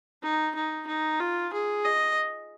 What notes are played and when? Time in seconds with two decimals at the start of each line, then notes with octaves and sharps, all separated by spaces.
0.23 D#4
0.55 D#4
0.87 D#4
1.19 F4
1.53 G#4
1.85 D#5